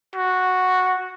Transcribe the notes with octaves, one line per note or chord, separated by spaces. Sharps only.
F#4